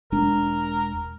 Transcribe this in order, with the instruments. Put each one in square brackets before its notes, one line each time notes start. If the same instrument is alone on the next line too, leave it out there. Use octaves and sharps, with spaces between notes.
[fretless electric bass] E1 G#3 D4 [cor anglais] A#4